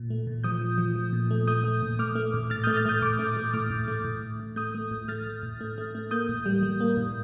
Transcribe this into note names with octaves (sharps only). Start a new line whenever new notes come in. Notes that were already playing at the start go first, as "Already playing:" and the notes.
Already playing: A#2
A3
A#2
F3 D#6 G6
F3
F3
F3
A#2
A3
A3 D#6 G6
A3
A#2
A3 D6 F6
A3
A2
A2 F6 A6
D#6 G6
A3
F6 A6
A3 D#6 G6
A2 D6 F6
A3
A3
A2 D6 F6
A2
A3
A2
A2
A2
A3 D#6 G6
A3
A2
A3 F6 A6
A2
A2
A3
A3
A3
A#3 D#6 G6
A2
G3
G3
A#3
A2